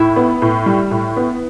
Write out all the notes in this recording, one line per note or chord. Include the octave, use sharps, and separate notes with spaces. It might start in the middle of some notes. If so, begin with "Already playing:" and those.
Already playing: A2 E4
B3
A2
G3
A2
B3